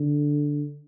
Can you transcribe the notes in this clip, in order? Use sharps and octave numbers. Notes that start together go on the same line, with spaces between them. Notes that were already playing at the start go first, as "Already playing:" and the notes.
Already playing: D3